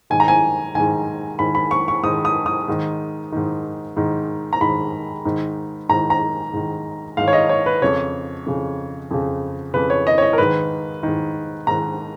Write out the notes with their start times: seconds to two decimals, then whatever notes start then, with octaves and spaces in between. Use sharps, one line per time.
0.10 G#2 D#3 G#5
0.20 A#5
0.28 G#5
0.75 G#2 D#3 G#5
1.39 G#2 D#3 B5
1.55 B5
1.71 C#6
1.88 C#6
2.03 G#2 D#3 D#6
2.25 D#6
2.46 D#6
2.68 G#2 D#3
3.32 G#2 D#3
3.96 G#2 D#3
4.53 A#5
4.61 G#2 D#3 B5
5.25 G#2 D#3
5.89 G#2 D#3 A#5
6.10 A#5
6.53 G#2 D#3
7.17 G#2 D#3 F5
7.28 C#5
7.33 D#5
7.49 C#5
7.66 B4
7.82 F2 C#3 C#5
8.46 F2 C#3
9.11 F2 C#3
9.74 F2 C#3 B4
9.90 C#5
10.07 D#5
10.18 C#5
10.22 D#5
10.33 A#4
10.38 G#2 D#3 B4
11.03 G#2 D#3
11.67 G#2 D#3 A#5